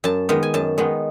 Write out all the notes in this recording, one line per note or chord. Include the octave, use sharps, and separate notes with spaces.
F#2 A5
D#3 G#3 B3
G#5
F#2 A5
D#3 G#3 B3